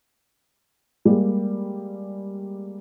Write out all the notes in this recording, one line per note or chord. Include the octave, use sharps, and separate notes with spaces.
G3 G#3 A#3